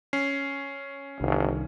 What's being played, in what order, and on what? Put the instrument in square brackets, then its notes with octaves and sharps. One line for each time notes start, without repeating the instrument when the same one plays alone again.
[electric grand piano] C#4 [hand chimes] C7
[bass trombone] G1 [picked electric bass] C2 D#3